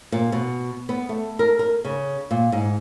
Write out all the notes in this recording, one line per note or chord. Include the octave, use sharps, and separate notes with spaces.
A#2
B2
B3
A3
A#4
A#4
C#3
A#2
G#2